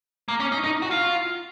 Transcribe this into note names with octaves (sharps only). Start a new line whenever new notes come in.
A#3
C#4
D#4
D#4
F#4
F4